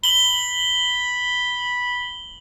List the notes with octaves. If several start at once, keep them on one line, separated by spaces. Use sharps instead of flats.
B5 F#7 G7